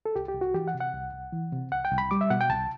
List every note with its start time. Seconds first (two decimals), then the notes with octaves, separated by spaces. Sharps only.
0.06 A4
0.16 C2 G4
0.28 G4
0.34 C2
0.41 F#4
0.54 E3 G4
0.68 F#5
0.74 C3
0.81 F#5
0.94 C2
1.13 C2
1.33 E3
1.52 C3
1.71 C2 F#5
1.85 G5
1.91 C2
1.98 B5
2.11 G3 D6
2.21 E5
2.30 B2 F#5
2.41 G5
2.50 C2 A5